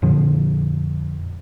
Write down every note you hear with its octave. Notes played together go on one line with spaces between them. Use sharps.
F2 A#2 D3 F3